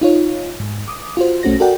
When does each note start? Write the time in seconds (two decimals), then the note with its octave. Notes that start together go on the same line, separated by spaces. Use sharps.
0.01 D#4 F4 C#5
0.60 G#2
0.88 D6 D#6
1.17 F4 F#4 C5
1.43 B1 A3 C#4 F#4 C5 A#6
1.60 F#4 A4 A#4 D5 F#5 G5